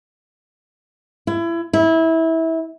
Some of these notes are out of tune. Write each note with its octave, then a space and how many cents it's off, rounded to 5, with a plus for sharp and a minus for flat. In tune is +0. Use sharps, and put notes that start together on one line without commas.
E4 +30
E4 -20